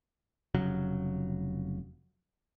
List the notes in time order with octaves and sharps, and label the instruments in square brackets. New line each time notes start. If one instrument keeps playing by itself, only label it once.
[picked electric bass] F1 C#3 F#3